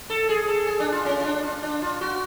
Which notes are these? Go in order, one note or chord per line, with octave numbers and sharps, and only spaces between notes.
A4
G#4
A4
G#4
D4
F4
C#4
F4
D4
F4
D4
F4
F#4